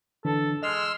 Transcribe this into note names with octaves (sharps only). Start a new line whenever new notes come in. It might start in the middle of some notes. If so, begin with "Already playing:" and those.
D3 E3 D4 A4
G#3 D#5 C6 E6 F6